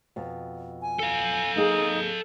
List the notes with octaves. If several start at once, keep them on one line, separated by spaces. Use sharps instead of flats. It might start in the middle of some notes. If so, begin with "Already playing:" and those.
F2 B2
G#5
A4 F5
A#3 D#4 G#4